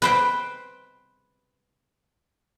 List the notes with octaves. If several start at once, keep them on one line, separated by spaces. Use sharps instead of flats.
B4 C5 G5